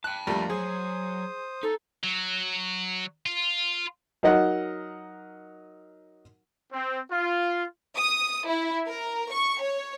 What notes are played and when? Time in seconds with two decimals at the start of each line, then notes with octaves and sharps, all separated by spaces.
0.04 G5 A5 F#6
0.27 F2 G3 A3 A#3 D4 A#5
0.50 F#3 G#4 C5 D#6
1.63 D#4 A4
2.04 F#3
3.26 F4
4.23 F#3 D#4 A#4 D#5 F#5
6.73 C4
7.10 F4
7.96 D#6
8.47 E4
8.86 A#4
9.31 C#6
9.61 C#5